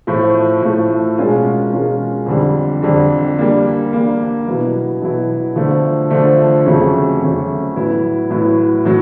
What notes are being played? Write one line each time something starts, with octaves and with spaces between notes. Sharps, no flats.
A2 F3 A3
A2 F3 A3
B2 G#3 C#4 F4 A#4
B2 G#3 C#4 F4 A#4
F2 D3 G3
F2 D3 G3
G3 A#3 D4
G3 A#3 D4
B2 F#3 B3 E4
B2 F#3 B3 E4
D3 F3 A3
D3 F3 A3
F2 C#3 F#3 A3 C#4
F2 C#3 F#3 A3 C#4
A2 F#3 B3 E4
A2 F#3 B3 E4
A2 F#3